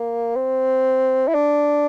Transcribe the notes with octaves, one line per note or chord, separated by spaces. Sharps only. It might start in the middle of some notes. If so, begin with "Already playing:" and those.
Already playing: A#3
C4
E4
D4